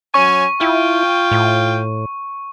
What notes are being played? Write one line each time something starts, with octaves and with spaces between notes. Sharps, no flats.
F#3 C#4 G#5 C#6
E4 F4 G5
A2